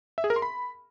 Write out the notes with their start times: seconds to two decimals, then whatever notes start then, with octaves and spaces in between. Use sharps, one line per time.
0.18 E5
0.24 G#4
0.30 A#4
0.36 C6
0.42 B5